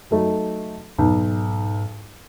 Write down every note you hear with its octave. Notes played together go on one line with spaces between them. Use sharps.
F#3 A3 D#4
B1 G#2